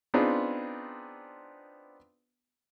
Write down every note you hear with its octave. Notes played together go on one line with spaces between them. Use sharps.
B3 C4 D4 D#4 F4 G#4